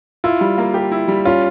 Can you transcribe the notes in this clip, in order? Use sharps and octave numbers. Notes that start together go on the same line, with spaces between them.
E4 F4
G3
A#3
G4
E4
G3
C#4 F4